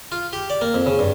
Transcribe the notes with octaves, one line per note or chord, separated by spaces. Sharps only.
F4
G4
D5
A#3
F2
C#3
G2